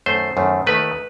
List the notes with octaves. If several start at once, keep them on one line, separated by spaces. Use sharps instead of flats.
F#2 D#3 A3 C5
F#2 D#3 A3
D#2 D#3 A3 B4